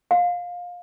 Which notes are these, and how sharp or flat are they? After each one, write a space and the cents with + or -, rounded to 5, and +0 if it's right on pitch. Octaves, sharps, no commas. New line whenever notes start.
F5 +20